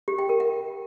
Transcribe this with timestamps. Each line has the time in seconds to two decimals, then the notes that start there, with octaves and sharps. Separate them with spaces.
0.08 G4
0.19 G5
0.29 A#4
0.40 F#5